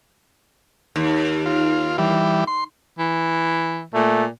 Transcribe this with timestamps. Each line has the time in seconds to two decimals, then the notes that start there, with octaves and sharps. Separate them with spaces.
0.96 D#2
1.46 F4
1.98 E3 G3
2.47 C6
2.98 E3
3.94 A#2 A3